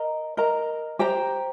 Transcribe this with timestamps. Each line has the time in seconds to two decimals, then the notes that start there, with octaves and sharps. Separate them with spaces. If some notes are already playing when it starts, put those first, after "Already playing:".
Already playing: A#4 D#5 A#5
0.37 A#4 D#5 A#5
0.99 G4 C5 G5 A#5